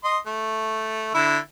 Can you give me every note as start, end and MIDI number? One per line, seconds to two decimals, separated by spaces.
0.04 0.18 75
0.04 0.18 84
0.26 1.11 57
1.14 1.38 50
1.14 1.38 64
1.14 1.38 88